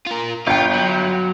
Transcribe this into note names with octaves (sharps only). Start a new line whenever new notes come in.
F4 A#4
G1 F4 G5
F#3